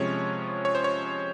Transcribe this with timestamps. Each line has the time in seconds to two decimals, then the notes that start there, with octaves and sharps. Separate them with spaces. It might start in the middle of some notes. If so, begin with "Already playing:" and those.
Already playing: C3 F3 G#3 C#4 C#5
0.65 C#5
0.75 C5
0.84 C#5